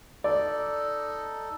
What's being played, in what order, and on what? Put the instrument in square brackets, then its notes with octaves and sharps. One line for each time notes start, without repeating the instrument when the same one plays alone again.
[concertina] D#4 A4 [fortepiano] D5